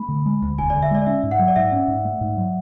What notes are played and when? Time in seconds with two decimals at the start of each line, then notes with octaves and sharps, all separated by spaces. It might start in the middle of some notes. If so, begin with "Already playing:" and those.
Already playing: A3 B5
0.09 D3
0.26 G#3
0.42 D2
0.58 E1 G#5
0.70 D3 D5
0.82 E5
0.91 G#3 D5
1.02 D5
1.06 C#4 E5
1.23 G#2
1.31 F#5
1.39 F#3
1.48 D5
1.56 G#2 E5
1.72 C#4
1.88 G#2
2.05 A3
2.21 G#2
2.37 F#3